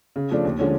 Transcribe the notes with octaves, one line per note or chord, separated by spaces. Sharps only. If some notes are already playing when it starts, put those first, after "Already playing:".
C#3
F3 A3 D4
D#2
D3 F3 G#3 C#4